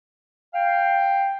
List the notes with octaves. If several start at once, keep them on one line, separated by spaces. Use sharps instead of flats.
F5 G5